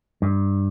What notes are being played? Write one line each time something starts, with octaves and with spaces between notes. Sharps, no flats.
G2